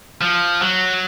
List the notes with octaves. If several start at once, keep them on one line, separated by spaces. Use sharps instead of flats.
F3
F#3